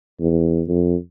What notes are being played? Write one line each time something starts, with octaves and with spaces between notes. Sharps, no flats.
E2
F2